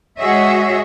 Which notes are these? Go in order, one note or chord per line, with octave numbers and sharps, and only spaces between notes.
G#3 F#4 G#4 C#5 D#5 E5